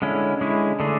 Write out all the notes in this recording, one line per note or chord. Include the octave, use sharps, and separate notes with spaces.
D3 G#3 C#4 E4
D3 G#3 C#4 E4
D3 A3 D4 G#4